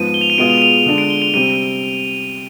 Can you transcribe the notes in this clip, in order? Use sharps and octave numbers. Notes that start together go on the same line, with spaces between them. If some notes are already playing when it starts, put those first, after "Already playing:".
Already playing: G#2 F3 B3 D#7
G7
F7
D#7
B2 G#3 B3 F4 G#4 D7
F7
D#7
F7
F7
D3 G#3 D4
D7
G7
F7
C3 G3 C4 D#7